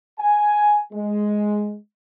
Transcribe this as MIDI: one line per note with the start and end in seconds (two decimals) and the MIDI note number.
0.19 0.80 80
0.93 1.75 56